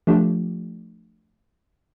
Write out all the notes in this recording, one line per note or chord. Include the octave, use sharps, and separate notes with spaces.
F3 A3 D4 G4